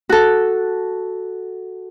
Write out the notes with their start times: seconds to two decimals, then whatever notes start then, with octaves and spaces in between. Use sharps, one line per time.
0.09 F#4 A4